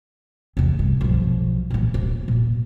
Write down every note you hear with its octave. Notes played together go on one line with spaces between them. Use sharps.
E2 C3
G2
B1 F3
A#2 E3
D#1 F4
A#2